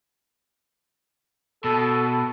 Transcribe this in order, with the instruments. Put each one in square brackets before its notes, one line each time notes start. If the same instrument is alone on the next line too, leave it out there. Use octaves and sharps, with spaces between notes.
[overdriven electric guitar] B2 [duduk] A4